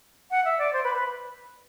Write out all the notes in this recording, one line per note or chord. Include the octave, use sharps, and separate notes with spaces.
F#5
E5
D5
C5
B4
B4